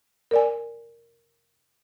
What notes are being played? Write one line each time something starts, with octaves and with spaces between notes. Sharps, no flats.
A#4 D5 G#5